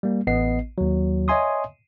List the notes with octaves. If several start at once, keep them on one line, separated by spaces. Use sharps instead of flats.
G3 A#3
A1 B3 D#5 C7
D#2 F#3
C#5 D#5 E5 G#5 C6 D#6